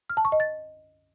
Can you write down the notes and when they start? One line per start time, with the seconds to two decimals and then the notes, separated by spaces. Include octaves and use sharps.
0.10 F6
0.17 A5
0.25 C#6
0.32 D#5
0.40 A6